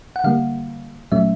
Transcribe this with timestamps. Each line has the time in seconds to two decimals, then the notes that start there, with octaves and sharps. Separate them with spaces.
0.16 F#5
0.24 D3 G3 A#3 F5
1.12 A#2 F#3 A3 C#4 E5